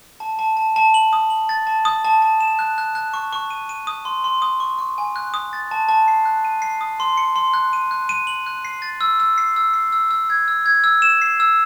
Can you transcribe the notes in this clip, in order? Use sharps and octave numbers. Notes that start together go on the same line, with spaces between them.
A5
A5
A5
A5
F#7
D#6
F#7
A6
A5
D#6
A5
A5
E7
F#6
F#6
F#6
C#6
C#6
D#7
D#7
D#6
C6
C6
D#6
C#6
C#6
G#5
F#6
D#6
A6
A5
A5
C7
F#6
D#7
C7
D#6
C6
C#7
C6
F#6
D#7
F#6
D#7
F#7
F#6
C7
A6
E6
E6
C7
E6
C7
E6
E6
G#6
E6
G#6
E6
E7
C7
E6